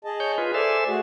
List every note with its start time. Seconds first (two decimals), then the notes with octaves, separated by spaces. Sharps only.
0.05 G#4 D#5 A5
0.20 C#5 G6
0.38 F4 G#4 B4
0.54 A4 C5 D5 E5 G#5
0.87 A3 F#4 G#4